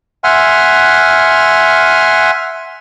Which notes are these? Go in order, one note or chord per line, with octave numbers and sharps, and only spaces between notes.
E5 F#5 G#5 C6 F6